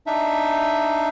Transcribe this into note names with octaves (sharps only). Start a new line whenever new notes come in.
D4 D#4 E5